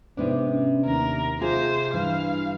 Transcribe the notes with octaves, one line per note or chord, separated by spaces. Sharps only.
G#2 C3 B3 D4
C#4
D#2 A#4
C3 F4 G#4 C5
G2 E3 F5